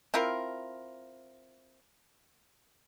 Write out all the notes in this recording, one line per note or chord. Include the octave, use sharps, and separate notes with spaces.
C4 E4 F4 A#4